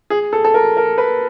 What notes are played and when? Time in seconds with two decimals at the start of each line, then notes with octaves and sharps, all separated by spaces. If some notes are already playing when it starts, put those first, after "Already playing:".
0.10 G#4
0.33 A4
0.44 A4
0.54 A#4
0.77 A#4
0.98 B4